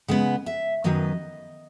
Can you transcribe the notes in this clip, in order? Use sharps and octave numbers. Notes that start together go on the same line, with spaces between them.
C#3 G#3 B3 F#5
E5
F#2 D#3 F#3 B3 D#5